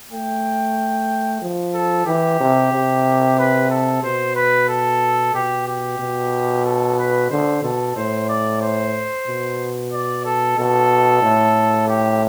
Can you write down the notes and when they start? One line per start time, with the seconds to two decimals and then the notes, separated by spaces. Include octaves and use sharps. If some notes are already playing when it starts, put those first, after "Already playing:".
0.10 A3 G5
1.42 F3
1.74 A4
2.06 E3 G4
2.40 C3
2.73 C3
3.38 B4
3.70 A4
4.03 B2 C5
4.36 B4
4.69 A4
5.34 B2 G4
5.67 G4
5.99 B2
6.65 A4
6.98 B4
7.30 D3 C5
7.63 B2 A4
7.96 A2 C5
8.29 D5
8.62 C5
9.27 B2
9.93 D5
10.25 A4
10.58 B2 A4
11.23 A2
11.88 G4